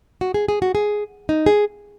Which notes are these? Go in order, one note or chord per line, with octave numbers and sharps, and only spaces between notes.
F#4
G#4
G#4
F#4
G#4
D#4
G#4